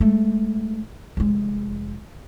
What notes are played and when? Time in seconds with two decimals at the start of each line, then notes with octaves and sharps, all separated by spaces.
0.01 G#3 A3
1.17 F1 G#3